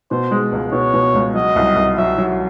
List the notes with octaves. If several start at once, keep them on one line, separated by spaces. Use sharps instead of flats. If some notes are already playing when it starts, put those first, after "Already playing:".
B2 C5
G#3
C#2
B2 C#5
B2
C#2
F#3 D#5
C2
C2
F#3 E5
F#3